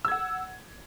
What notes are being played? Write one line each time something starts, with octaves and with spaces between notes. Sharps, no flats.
F#5 E6 G#6